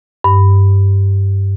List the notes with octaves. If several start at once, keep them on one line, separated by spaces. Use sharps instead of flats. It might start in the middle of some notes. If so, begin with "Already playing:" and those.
G2